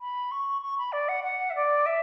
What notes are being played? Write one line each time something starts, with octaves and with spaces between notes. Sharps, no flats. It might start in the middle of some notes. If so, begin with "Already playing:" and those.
B5
C#6
C#6
B5
D5
F#5
F#5
E5
D5
E5